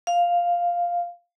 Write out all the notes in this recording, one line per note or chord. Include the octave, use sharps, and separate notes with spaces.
F5